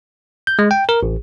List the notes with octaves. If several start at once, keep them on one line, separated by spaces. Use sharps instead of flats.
G6
G#3
G5
A#4
A1